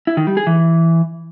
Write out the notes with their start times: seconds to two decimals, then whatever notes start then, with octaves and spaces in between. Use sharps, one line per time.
0.07 E4
0.17 D#3
0.27 G3
0.37 G#4
0.47 E3